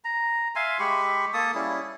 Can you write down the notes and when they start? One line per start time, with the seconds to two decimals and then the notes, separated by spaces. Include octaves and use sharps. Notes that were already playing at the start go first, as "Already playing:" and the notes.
0.04 A#5
0.55 E5 F5 G#5 C6
0.80 G#3 G4 B5 C#6
1.34 A#3 A4 A5 D#6
1.55 G3 C#4 E4 G#4